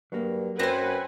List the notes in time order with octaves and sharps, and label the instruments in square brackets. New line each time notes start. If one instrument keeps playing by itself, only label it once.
[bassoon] G2 [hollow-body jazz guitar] F#3 A#3
[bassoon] F#2 [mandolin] C4 C5 [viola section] B4 F#5 G#5